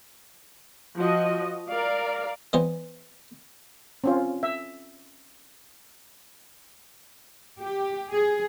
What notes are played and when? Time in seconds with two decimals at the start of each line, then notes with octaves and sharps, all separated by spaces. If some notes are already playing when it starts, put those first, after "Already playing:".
0.97 F3 F#4 D#5
1.69 A#4 D5 F5
2.53 E3 G3 B3 C5 D#5
4.04 C4 C#4 F4
4.43 E5
7.61 G4
8.10 G#4